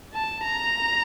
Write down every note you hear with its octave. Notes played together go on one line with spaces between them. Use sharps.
A5
A#5